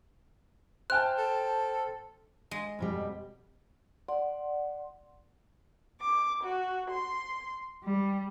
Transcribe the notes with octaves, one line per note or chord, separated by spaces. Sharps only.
C5 E5 G5 A5 F6 F#6
A4
G#3
F2 B2 G3
D5 F#5 C6
D6
F#4
C6
G3